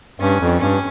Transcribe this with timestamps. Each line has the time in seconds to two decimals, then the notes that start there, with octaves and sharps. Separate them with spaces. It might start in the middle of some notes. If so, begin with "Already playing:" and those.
0.20 G2 C#4
0.40 F2
0.60 G2 C#4